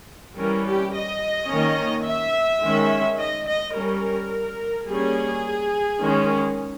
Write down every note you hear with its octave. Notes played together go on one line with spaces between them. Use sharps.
E3 G3 C#4 A#4
G4
D#5
D#3 A#3 C#4
E5
D#3 G#3 C#4
D#5
D#5
G3 C#4 A#4
G3 A#3 C#4 G#4
D#3 G#3 C#4